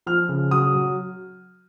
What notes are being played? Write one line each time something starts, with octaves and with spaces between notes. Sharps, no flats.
F3 F6
C#3
F#3 D#6
F#3